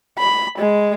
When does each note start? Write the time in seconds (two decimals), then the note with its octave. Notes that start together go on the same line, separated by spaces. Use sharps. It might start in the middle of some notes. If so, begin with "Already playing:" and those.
0.18 B5
0.59 G#3